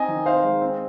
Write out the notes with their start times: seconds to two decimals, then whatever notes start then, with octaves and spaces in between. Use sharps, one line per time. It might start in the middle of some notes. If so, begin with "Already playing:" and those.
Already playing: C4 D#4 D#5 G#5
0.08 D#3
0.26 D#4 C5 F5
0.43 G#3
0.61 C4